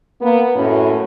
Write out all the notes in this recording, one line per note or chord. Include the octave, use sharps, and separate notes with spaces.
A#3 B3
F#2 A2 C#4